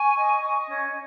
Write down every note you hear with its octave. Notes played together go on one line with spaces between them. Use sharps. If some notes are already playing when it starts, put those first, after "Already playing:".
Already playing: G#5 C#6
D#5
D#5
C#4